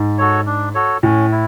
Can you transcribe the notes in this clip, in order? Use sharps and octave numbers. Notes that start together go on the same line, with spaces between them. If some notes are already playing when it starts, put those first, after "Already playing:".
Already playing: G#2
F#4 A4 C#5
D4
F#4 A4 C#5
A2 C#4
E4